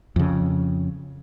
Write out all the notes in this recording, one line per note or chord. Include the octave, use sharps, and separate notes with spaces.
F2 C#3